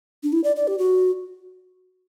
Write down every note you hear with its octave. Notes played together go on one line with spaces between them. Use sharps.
D4
E4
D5
D5
G4
F#4